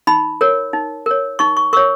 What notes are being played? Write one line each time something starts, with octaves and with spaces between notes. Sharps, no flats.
D#4 B5
A#4 C#5
D#4
A#4 C#5
D#4 C#6
C#6
A#4 C#5 C#6